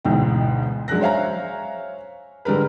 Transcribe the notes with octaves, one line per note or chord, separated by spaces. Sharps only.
A1 D2 G#2 B2 G5
F#3 G#3 D4 F#6 A#6
C5 C#5 E5 F5 G#5 A#5
D3 G3 G#3 A#4 B4